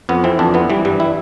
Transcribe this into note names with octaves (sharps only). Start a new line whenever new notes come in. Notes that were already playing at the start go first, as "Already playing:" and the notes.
F2 B3
E3 C4
F2 D4
E3 B3
E3 G3
G2 G3
E4